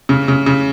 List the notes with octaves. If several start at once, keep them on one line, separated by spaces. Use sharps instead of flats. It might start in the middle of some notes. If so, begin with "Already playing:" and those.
C#3
C#3
C#3